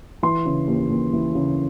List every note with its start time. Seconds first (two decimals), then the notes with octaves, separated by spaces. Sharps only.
0.23 E3 C6
0.45 C#3
0.67 D#2
0.90 D#2
1.13 E3
1.35 C#3